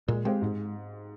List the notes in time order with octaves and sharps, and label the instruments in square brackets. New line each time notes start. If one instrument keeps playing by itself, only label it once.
[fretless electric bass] A#2 [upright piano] G#3
[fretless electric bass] G#3 [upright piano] C4 G4 C5 F5
[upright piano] G#2